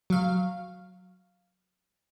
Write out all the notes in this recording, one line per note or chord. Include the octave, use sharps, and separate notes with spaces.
F#3 F5